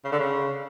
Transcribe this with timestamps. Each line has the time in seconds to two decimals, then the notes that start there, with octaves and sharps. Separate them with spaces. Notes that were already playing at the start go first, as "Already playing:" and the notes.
0.04 C#3
0.12 D3
0.19 C#3